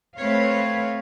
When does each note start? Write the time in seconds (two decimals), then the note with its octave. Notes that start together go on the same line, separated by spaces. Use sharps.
0.19 A3 C4 B4 C#5 F5